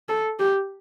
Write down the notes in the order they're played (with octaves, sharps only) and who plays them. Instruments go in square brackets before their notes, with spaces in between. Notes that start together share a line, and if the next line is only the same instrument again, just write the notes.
[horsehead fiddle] A4
G4